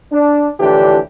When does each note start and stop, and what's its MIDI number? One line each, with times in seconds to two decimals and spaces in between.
0.13 0.49 62
0.60 0.98 45
0.60 0.98 50
0.60 0.98 52
0.60 0.98 53
0.60 0.98 62
0.60 0.98 67